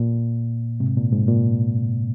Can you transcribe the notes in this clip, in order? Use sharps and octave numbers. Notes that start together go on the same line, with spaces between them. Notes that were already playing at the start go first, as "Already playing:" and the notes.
Already playing: A#2
G#2 C3
A#2
G#2
A#2